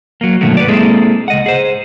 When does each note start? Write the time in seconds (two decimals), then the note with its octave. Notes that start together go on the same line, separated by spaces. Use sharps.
0.21 F#3 A#3
0.41 G2 B2 D#3 F#3 A3 A#3
0.57 B4 C#5 D5
0.68 G#3 A#3 C4 E4 G#4 A4
1.28 C#2 D#5 F#5
1.46 G#4 C5